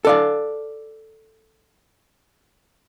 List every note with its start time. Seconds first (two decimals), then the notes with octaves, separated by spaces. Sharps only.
0.05 A4 D5 F5